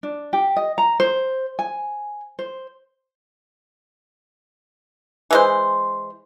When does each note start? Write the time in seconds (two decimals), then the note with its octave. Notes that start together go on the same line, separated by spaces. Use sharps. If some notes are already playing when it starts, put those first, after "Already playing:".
0.03 D4
0.33 G4
0.56 D#5
0.78 A#5
1.00 C5
1.59 G#5
2.39 C5
5.31 E3 G#3 C5